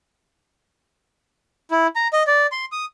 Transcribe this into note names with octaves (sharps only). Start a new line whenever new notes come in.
E4
A#5
D#5
D5
C6
D#6